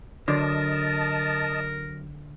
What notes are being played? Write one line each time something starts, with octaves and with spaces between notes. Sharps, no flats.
D3 F#3 A#4 D#5 A5